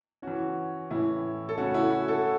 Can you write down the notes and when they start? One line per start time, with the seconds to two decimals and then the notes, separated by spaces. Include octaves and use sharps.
0.22 E3 C#4 F#4
0.90 A2 E3 C#4 E4
1.49 A4
1.57 C#3 A3 C#4 F#4
1.74 E4
1.91 F#4
2.08 A4